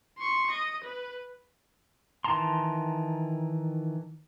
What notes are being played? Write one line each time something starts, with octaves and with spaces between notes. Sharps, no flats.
C6 C#6
D#5
B4
D#3 E3 A5 A#5 C6